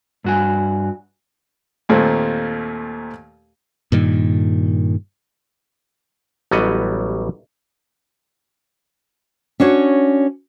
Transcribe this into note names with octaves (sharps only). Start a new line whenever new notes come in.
G2 F#4 G#5
D#2 A#2 A3 C4
G2 A#2 D#3
A1 F#3 G3 B3 D#5 F#5
C#4 D4 F#4 C#5